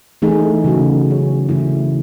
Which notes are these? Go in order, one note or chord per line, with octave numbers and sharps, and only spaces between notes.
E3 A3 D#4 G#4
C#3 F#3 C#4 F#4
D#3 A3 D#4 G#4 C#5
C#3 E3 A3 E4